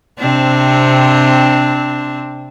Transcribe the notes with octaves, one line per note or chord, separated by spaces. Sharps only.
C3 C4 D4